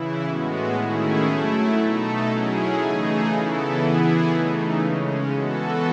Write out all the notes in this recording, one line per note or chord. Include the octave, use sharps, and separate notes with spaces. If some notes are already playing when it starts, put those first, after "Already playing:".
Already playing: C#3 E3 E4
A2 G#3 B3 F#4
D#3 A3 C#4 E4 G#4
F#3 A3 E4
B2 A3 D#4 A4
F#3 C#4 E4 G#4
C#3 E3 A3 D#4 G#4
C#3 E3 B3 E4 A4
E3 B3 E4 G#4
C#3 E3 A3 D#4
C#3 G#3 C#4
E3 B3 F#4 A4